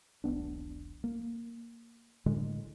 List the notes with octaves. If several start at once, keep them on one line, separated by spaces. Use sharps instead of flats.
E1 B1 B3 D4
A#3
A2 D3 G#3